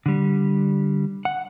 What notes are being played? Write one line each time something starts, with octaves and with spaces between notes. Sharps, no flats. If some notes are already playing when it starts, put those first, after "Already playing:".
D3 G3
F#5